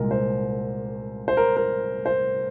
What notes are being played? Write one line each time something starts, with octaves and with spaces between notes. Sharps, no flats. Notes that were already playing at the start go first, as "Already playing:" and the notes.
Already playing: C2 A#2 G#3 A#4
C5
C5
A#4
A#4
C5